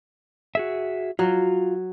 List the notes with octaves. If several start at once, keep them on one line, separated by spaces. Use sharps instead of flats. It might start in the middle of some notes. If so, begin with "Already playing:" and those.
F#4 G#4 E5
F#3 F4